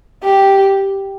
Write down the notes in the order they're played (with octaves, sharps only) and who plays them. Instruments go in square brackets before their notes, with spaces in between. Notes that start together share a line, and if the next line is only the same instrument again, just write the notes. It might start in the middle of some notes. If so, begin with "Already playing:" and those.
[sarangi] G4